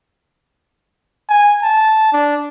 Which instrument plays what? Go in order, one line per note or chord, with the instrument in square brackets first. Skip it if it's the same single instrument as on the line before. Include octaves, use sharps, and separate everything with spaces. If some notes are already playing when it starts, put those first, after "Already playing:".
[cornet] G#5
A5
D4